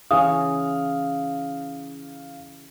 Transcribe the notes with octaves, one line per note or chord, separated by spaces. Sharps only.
C#3 E3 C#4 F5 D#6